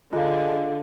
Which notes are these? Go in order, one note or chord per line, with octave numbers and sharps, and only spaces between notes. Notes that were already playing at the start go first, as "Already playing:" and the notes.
D3 G#3 F4 F5